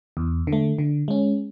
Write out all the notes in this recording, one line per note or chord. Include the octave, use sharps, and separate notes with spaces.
E2
D3
A3
D3
G#3 C#4